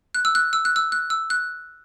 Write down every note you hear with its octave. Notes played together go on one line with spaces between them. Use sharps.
F#6
E6
F#6
E6
F#6
E6
F#6
E6
F#6